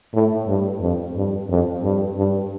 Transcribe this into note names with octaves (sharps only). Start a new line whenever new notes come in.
A2
G2
F2
G2
F2
G2
G2